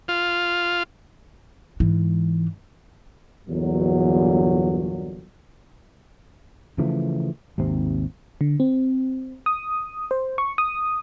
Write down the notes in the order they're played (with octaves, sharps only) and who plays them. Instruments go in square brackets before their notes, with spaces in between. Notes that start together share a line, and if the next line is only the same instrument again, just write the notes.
[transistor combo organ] F4
[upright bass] G#2 E3
[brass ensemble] G1 E2 A#2 F#3
[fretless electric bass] C#3 E3 F3 A3
G#1 D#2 C3 C4
[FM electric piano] D3
C4
D#6
C5
C#6
D#6